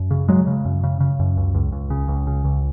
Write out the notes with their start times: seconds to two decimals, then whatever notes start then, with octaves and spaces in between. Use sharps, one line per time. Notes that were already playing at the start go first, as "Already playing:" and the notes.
Already playing: F#2
0.11 C#3
0.28 C#3 F#3 G#3
0.47 C#3
0.65 F#2
0.84 C#3
1.00 C#3
1.20 F#2
1.37 C#2
1.54 C#2
1.72 C#2
1.90 C#3
2.08 C#2
2.27 C#3
2.45 C#2